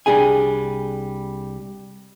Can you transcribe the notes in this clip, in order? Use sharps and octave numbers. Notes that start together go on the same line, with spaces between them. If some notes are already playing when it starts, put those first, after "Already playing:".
C2 G3 D4 G#4 G#5